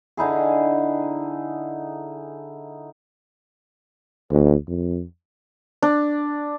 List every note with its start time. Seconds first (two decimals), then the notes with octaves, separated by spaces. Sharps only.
0.17 D3 D#4 E4 G#4
4.32 D2
4.67 F2
5.83 D4